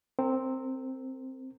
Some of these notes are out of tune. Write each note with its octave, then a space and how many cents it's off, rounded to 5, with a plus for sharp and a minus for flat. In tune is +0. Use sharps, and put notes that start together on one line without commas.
C4 +0 A#4 -25